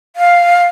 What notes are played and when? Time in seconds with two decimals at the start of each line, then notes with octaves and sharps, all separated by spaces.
0.16 F5